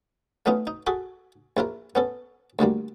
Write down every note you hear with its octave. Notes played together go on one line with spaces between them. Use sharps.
A3 B3 C#4 D#4 F4
D#4
F#4 G#4 A4 B5
A#1 E4 F4 A#4
B3 C#4 A4
D2 D3 G3 A#3